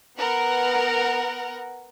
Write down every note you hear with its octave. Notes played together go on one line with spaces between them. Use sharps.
B3 A#4 F#5